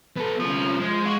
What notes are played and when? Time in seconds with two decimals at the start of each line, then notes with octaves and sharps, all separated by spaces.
0.16 B3 A4
0.40 C2 F3 C#4
0.80 G#3
1.06 F4 F#4